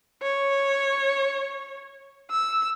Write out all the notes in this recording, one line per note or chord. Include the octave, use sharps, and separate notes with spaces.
C#5
E6